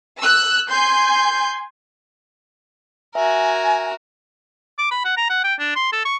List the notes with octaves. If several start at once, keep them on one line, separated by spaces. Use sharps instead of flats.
E6 F#6
G#5 C6 G6
F#4 A#4 E5 G#5
D6
B5
F#5
A#5
F#5
G5
D4
C6
A4
C#6